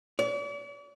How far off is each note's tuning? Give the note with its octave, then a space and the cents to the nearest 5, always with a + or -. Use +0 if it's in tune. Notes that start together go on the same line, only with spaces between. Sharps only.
D5 -45